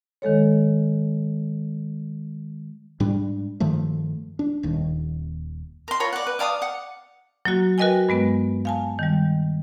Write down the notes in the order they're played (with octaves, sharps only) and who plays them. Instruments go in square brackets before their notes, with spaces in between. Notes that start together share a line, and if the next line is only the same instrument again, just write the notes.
[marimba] D#3 G#3 A4 C#5
[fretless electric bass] G#2 G3 D4
G2 D#3 F3 A3
D4
D#1 D#2
[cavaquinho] A#4 C6
F4 A#4 C#5 B5
D5 F#5
B4
D5 F5 A5 D#6
F#5
[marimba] F#3 A#3 F#4
F#4 A#4 B4 D#5 G5 G#5
G2 G#3 B3 B4
F5 G#5 A5
D#3 G3